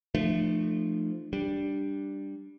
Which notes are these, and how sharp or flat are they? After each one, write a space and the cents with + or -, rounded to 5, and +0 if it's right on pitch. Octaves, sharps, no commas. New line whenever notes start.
F3 -15 A3 +0 D4 +45
G3 +0 D4 +0